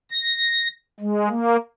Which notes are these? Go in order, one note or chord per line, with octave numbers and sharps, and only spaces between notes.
A#6
G#3
A#3